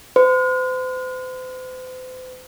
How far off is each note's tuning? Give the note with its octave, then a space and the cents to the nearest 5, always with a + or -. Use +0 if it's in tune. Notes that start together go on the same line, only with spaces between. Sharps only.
C5 -40